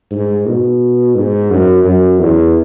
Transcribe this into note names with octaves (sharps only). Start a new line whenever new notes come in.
G#2
B2
G#2
F#2
F#2
E2